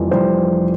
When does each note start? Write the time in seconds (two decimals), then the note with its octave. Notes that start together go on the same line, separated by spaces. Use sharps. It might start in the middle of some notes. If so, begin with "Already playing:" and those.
Already playing: F1 F2 E3 G3
0.11 F1 F2 E3 G3 C5